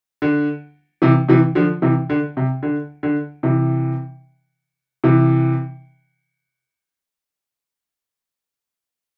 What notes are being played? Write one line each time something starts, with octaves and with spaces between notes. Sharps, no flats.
D3
C3 E3
C3 E3
D3 F3
C3 E3
D3
C3
D3
D3
C3 E3
C3 E3